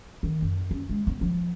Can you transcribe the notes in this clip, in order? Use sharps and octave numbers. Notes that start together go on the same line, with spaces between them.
D#3
F#2
C#4
G#3
B3
F3